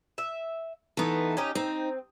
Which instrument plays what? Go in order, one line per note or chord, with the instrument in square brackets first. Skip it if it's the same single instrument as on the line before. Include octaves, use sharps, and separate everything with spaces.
[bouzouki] E5
[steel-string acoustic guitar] E3 D#4 [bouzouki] A3 B3
[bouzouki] C#4 D#4 G4
[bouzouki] C4 [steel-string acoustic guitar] D#4